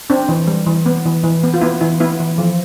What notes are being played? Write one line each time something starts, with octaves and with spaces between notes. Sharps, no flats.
C4 D4
E3
G3
E3
B3
E3
E3
B3
F4
B3 E4
E3 E4
B3 E4
E3
F3